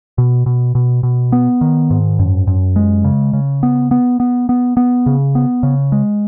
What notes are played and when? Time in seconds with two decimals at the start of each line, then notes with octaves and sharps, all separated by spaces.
0.18 B2
0.46 B2
0.75 B2
1.03 B2
1.32 B3
1.61 D#3
1.91 G#2
2.19 F#2
2.47 F#2
2.76 G#3
3.04 C#3
3.33 C#3
3.63 B3
3.91 B3
4.20 B3
4.49 B3
4.77 B3
5.06 C#3
5.35 B3
5.63 C#3
5.92 G#3